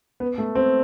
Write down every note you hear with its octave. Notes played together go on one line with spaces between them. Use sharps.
B3
A3
C4